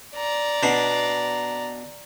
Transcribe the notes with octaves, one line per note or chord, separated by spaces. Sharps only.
D5 A#5
B2 D4